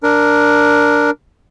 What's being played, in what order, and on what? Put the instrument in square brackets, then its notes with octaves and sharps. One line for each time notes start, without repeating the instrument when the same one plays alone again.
[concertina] D4 A#4